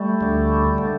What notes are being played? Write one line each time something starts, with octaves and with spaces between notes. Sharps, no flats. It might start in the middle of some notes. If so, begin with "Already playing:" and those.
Already playing: G3 A3
D2 D3
D3